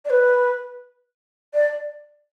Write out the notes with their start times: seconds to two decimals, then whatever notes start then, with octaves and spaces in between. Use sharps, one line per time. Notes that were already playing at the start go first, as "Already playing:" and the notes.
0.05 D5
0.10 B4
1.54 D5